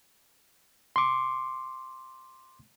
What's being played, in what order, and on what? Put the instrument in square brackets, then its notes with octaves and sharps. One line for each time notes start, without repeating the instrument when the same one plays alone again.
[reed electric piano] C6 D6